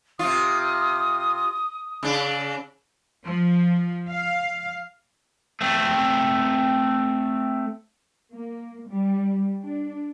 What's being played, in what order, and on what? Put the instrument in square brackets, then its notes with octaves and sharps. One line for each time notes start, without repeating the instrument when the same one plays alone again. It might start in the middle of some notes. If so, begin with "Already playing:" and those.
[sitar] C3 F4 [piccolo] D#6
[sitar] C#3 D4
[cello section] F3
F5
[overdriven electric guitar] A3 C4
[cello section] A#3
G3
D4